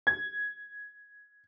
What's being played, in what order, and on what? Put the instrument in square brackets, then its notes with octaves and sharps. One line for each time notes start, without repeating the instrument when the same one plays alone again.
[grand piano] G#6